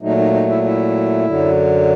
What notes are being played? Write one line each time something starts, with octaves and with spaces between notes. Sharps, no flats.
A#2 F#3 A3 D#4
D#4
D#4
E4
E4
F#2 D3 F#3